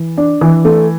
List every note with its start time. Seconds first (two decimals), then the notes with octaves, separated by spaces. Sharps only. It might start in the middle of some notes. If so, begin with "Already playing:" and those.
Already playing: E3
0.17 D4
0.41 E3
0.65 A3